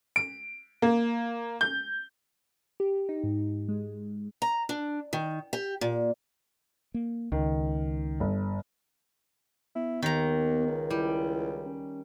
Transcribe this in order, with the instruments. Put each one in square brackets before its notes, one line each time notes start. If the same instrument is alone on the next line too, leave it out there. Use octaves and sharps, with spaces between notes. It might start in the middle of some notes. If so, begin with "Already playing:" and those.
[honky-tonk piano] D7
A#3
G6
[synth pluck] G4
D#4
G#2
G#3
[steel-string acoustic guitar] A#5
D4
D#3
G4
A#2
[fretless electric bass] A#3
[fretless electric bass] C#2 [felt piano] D#3
[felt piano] G1
[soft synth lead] B3 [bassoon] E4
[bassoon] D#2 [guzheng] D#3 A#5
[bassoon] C#2
[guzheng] G3 [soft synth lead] E4
[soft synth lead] C#4